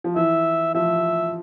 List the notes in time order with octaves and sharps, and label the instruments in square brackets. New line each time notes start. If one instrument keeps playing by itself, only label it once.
[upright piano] F3
[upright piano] E3 [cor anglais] E5
[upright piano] F3 [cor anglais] E5